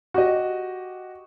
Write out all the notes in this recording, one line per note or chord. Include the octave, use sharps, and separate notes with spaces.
F#4 G4 D#5